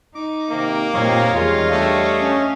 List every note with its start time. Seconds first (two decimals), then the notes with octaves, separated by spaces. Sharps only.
0.15 D#4 D6
0.50 C3 D#3 A#3
0.94 A#2 D#3 G3 C4 C#5 D#5 F5
1.34 E2 D#3 G3 G#3 F4
1.71 G3 A3 D4
2.20 C#4